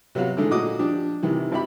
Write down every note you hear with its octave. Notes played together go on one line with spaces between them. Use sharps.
C3 F#3 B3 F#4 F5
D3 E3 G#3 A3 D#4 G#4
A#2 F#4 D#5 D6 D#6
F3 D4 G4
C3 D#3 E3
G#1 E4 G4 B5